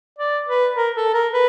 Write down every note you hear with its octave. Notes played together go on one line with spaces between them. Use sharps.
D5
B4
A#4
A4
A#4
B4